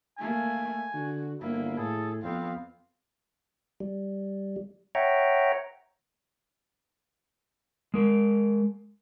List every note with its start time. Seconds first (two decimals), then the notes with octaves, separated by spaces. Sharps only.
0.19 A3 A#3 G#5
0.94 D3 F#4
1.41 G1 A#3 E4
1.78 A2 G#4 A4
2.24 F2 B3 C4 F5
3.80 G3
4.95 C#5 E5 F#5 G5 A#5
7.94 G#3 A#4